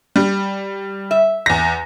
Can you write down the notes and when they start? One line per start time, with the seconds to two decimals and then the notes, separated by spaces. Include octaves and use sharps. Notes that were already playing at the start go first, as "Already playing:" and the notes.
0.16 G3
1.11 E5
1.46 E2 A#6